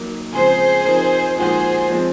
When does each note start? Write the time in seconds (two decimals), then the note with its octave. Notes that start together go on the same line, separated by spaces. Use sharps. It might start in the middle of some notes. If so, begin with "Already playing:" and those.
Already playing: F#3 A#3 D#4 A#4
0.32 C#3 F3 G#3 C4 G#4 C5
0.85 F3 C4 D#4 A#4
1.36 A#2 F3 G#3 D#4 F#4 G#4 C5
1.88 F3 G#3 C4